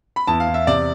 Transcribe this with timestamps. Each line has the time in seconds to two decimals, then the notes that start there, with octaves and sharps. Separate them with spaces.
0.16 B5
0.27 E2 A5
0.40 F5
0.47 E2
0.54 E5
0.67 C3 D5